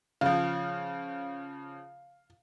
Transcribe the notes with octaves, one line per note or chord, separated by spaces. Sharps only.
C#3 F3 F5